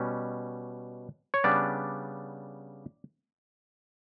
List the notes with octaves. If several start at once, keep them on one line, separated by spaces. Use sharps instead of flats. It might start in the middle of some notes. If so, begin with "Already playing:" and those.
Already playing: B2 G3 C#4
C#5
C#3 G3 B3 D4 D5